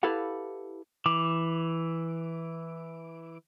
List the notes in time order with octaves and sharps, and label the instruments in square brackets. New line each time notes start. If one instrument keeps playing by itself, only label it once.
[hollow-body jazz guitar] E4 G4 A4 B4 F5 F#5
[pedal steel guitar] E3 D6